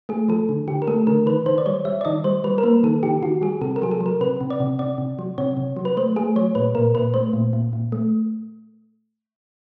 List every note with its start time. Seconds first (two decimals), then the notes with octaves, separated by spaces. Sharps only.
0.09 A3 G#4
0.29 F3 A4
0.49 D3
0.68 D3 G4
0.82 A#4
0.87 A3 A4
1.07 D3 A#4
1.26 D#3 B4
1.46 D#3 C5
1.58 D5
1.66 G3 C#5
1.85 G3 E5
2.01 D5
2.05 D#3 D#5
2.24 G3 C5
2.44 G3 B4
2.58 A#4
2.63 A#3 B4
2.83 D#3 A4
3.03 D#3 G4
3.22 D#3 F#4
3.42 G3 G#4
3.61 C3 A4
3.76 A#4
3.82 F#3 G#4
3.91 A4
4.01 F#3
4.06 A#4
4.21 C3 B4
4.41 C3
4.50 D5
4.60 C3
4.79 C3 D5
4.98 C3
5.19 F#3
5.38 C3 C#5
5.57 C3
5.77 F#3
5.85 B4
5.97 A3 C5
6.16 A3 G#4
6.36 F#3 C#5
6.55 A#2 B4
6.75 A#2 A#4
6.95 A#2 B4
7.14 A3 C5
7.33 A#2
7.53 A#2
7.73 A#2
7.92 A3